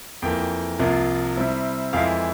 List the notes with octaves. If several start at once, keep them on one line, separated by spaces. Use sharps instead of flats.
F2 E3 A#3 G5
C2 C3 F3 A#3 F4
C3 G3 C4 E4
F2 E3 G#3 E4 F5